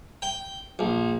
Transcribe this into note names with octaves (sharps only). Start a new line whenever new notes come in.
G5
A#1